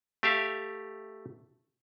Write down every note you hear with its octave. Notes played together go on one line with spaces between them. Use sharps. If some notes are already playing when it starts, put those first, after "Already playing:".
A3 G4 E5 F5